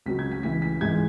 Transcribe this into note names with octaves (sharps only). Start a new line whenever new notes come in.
C#2 C#3 F#3 B6
G#6
B6
C#2 C#3 E3 B6
B6
G#2 E3 G#3 G#6